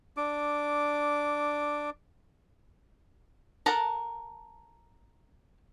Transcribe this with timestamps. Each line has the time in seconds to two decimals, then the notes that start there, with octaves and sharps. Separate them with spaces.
0.17 D4 D6
3.66 A4 A#4 F#5 A5 A#5